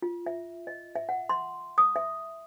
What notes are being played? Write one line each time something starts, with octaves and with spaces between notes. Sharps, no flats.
F4
E5
D#5
E5
F#5
C6
D#6
E5